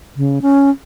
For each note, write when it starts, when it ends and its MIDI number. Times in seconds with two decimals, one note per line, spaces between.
0.16 0.39 49
0.42 0.70 61